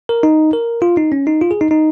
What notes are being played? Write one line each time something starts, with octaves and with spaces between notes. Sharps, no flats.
A#4
D#4
A#4
F4
D#4
C#4
D#4
F4
G#4
D#4
D#4